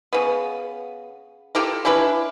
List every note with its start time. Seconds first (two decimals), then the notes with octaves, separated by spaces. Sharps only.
0.13 C#3 B3
1.55 F4 G4 A4 A#4
1.85 C#4 D4 E4 B4